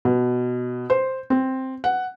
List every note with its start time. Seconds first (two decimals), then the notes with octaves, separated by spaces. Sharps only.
0.05 B2
0.90 C5
1.30 C4
1.84 F#5